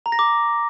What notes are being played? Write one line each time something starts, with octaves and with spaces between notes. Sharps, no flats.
A#5
A#6
D6